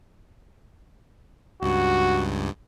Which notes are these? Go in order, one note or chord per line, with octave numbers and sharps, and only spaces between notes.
C#2 G2 F#4